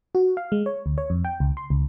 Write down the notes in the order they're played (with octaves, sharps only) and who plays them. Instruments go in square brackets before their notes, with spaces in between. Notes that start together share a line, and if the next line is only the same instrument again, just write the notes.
[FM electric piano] F#4
F5
G#3
C#5
D2
C#5
F2
G5
C#2
C6
C#2